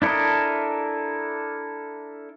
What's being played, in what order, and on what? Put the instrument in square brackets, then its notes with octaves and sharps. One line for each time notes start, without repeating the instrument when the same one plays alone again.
[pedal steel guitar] D4 E4 A4 A#4 D#5